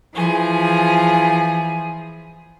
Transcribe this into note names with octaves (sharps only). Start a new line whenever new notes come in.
E3 F3 G#4